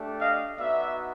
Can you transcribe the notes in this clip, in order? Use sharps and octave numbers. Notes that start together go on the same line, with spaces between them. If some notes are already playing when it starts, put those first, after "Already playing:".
Already playing: A3 D4 G4
D#5 F5
B3 D#4 F#4 D5 E5